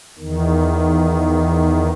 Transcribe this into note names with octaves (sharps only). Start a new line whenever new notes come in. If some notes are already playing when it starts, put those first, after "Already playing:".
E2 D#3